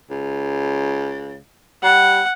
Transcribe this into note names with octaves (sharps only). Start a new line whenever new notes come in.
C#2
G3 F#5